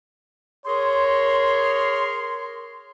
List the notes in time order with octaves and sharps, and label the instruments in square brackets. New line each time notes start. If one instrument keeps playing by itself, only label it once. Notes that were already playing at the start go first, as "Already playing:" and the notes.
[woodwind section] G#4 A#4 C6 [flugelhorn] C#5